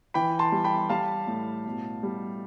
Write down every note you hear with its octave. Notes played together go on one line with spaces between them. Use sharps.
E3 G5 B5
A5 C6
G3
G5 B5
G3 F5 A5
A2
B2
G3